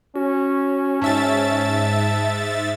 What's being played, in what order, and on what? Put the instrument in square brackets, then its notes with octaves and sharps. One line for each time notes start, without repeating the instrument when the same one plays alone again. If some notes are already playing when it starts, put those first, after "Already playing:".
[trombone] C#4 [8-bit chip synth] F#4
[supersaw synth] G#2 E5 A6 [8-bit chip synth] A5